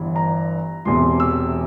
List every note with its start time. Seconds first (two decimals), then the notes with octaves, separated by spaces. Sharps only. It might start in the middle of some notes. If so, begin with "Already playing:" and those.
Already playing: G1 G2 E3
0.16 A#5
0.85 E1 E2 C3 C6
1.20 E6